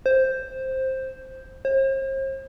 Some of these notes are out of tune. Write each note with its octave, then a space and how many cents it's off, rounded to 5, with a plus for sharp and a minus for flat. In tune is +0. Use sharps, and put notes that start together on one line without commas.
C5 +5
C5 +45